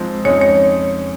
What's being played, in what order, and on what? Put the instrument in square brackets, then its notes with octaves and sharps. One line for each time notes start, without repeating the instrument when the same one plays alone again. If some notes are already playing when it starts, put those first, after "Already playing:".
Already playing: [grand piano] G#2 F3 G#3 C4
[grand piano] F2 C#3 G#3 D#4 [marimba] C#5
[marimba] C#5